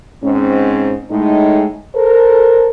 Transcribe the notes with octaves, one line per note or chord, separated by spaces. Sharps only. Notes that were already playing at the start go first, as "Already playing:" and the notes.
G#2 C4 C#4
A2 G#3 D#4
A4 A#4 C5